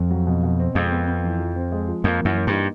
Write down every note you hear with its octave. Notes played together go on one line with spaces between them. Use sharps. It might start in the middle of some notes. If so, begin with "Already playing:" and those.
Already playing: F2
F#3
B2
B2
C4
F2 G#3
B3
B3
E3
F3
C4
G#3
F3
F2 A#3
F#2 E3
A#3
G2
D#4